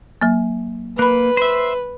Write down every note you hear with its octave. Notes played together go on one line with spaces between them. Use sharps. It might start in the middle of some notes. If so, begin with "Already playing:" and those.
F#3 A#3
A#3 B4 B5 F#6
C5 E5